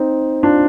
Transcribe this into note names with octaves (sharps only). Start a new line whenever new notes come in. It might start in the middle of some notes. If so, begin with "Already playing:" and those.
Already playing: C4 D#4
D4 F4